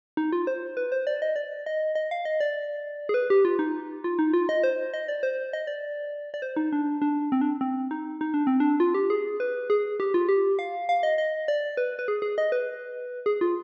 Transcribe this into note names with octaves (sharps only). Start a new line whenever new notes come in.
D#4
F4
C5
B4
C5
D5
D#5
D5
D#5
D#5
F5
D#5
D5
G#4
B4
G4
F4
D#4
F4
D#4
F4
D#5
C5
D#5
D5
C5
D#5
D5
D5
C5
D#4
D4
D4
C4
D4
C4
D#4
D#4
D4
C4
D4
F4
G4
G#4
B4
G#4
G4
F4
G4
F5
F5
D#5
D#5
D5
B4
B4
G#4
G#4
D#5
B4
G#4
F4